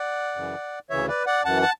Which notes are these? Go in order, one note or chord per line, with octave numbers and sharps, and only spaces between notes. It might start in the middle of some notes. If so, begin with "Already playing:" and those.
Already playing: D5 F#5
F#2 C#3 E3
D2 C#3 E3 C#5 E5
B4 D5
D5 F#5
F#2 E3 F#5 A5
A5